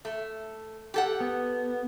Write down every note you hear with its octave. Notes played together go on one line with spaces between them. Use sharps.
A3
G4 A4 F#5
B3